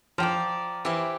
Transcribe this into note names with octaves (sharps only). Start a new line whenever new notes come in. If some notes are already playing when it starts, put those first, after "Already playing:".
F3 D5 G5 A#5
E3 E4 G4 C5 F5